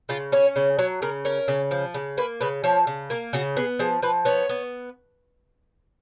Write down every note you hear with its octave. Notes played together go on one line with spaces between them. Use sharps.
C#3 F4
C#4 C#5
C#3
F#3 C#5
C#3 A#4
C#4 A#4
C#3
F3
C#3
A#3 B4
C#3 B4
F3 C#5
C#3
A#3 A#4
C#3 F#4
B3 G#4
F3 G#4
F3 B4
B3 C#5
B3